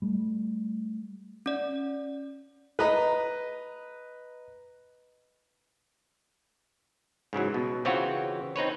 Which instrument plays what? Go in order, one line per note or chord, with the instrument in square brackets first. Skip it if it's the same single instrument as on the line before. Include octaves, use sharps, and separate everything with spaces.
[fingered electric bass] G3 A3
[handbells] C#4 D5
[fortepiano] B4 D#5 A#5
[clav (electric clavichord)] G#2 C#3 E3 F#3
B2
C#3 E3 C4 F4 F#4 C#5
C4 D#4 B4 C#5